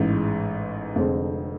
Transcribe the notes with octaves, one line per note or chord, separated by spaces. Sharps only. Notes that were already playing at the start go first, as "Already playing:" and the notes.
Already playing: A1 G#2 E3 G#3
F1 F2 D3 G#3 C4